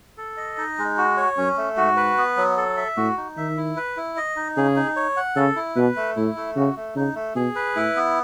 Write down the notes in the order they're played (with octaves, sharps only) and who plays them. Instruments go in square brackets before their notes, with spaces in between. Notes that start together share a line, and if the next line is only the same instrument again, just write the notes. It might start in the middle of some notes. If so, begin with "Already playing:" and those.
[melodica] A4
D#5
D#4
G#3
F#4
C#5
[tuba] F#2 [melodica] C#4
[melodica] A3
[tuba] G#2 [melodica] F#4
[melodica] B4
B3
F#3
A4
E5
[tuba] A2 [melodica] F#4
[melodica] D#4
[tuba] D#3 [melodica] E5
[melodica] E4
B4
E4
D#5
D#4
[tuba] C#3 [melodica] G#4
[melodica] D#4
C#5
F#5
[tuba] C#3 [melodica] A4
[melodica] E4
[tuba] B2 [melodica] B4
[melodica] A3
[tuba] A2 [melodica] E4
[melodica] A3
[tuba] C#3 [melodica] F#4
[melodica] A3
[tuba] C#3 [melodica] D#4
[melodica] A3
[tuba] B2 [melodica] G#4
[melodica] B4
[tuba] A2 [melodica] E4
[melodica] B3